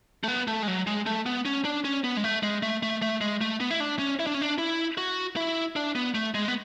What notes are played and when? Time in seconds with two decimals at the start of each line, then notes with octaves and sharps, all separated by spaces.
0.24 A3
0.28 B3
0.47 A3
0.62 G#3
0.68 F#3
0.87 G#3
1.06 A3
1.26 B3
1.45 C#4
1.65 D4
1.85 C#4
2.04 B3
2.17 G#3
2.24 A3
2.43 G#3
2.63 A3
2.83 A3
3.02 A3
3.21 G#3
3.41 A3
3.60 B3
3.71 E4
3.80 D4
3.99 C#4
4.19 E4
4.27 D4
4.34 C#4
4.42 D4
4.58 E4
4.98 F#4
5.36 E4
5.76 D4
5.95 B3
6.15 A3
6.34 G#3
6.48 B3